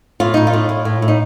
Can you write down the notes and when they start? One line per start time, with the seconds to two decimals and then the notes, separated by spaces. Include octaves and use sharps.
0.20 A2 F4
0.34 A2 D#4
0.47 F4
0.53 A2
0.69 A2
0.85 A2
1.02 A2
1.08 D#4